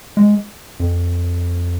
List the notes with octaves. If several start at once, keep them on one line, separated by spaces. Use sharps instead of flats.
G#3
F2